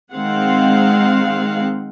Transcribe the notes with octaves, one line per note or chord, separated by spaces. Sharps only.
D#3 G#3 C4 F5 F#5